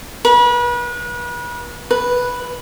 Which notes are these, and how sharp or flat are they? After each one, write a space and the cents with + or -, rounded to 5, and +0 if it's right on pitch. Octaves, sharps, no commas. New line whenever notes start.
B4 -35
B4 -5